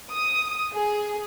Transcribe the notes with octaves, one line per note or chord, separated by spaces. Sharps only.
D#6
G#4